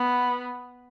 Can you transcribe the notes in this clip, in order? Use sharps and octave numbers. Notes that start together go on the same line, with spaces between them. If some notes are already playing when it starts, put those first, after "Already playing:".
Already playing: B3